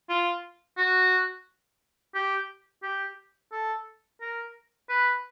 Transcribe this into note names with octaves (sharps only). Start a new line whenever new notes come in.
F4
F#4
G4
G4
A4
A#4
B4